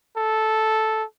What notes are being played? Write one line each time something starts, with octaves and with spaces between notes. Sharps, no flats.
A4